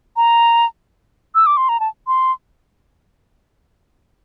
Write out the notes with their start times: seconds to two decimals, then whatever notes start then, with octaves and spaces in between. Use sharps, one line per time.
0.17 A#5
1.35 E6
1.46 D6
1.57 C6
1.69 A#5
1.80 A5
2.07 C6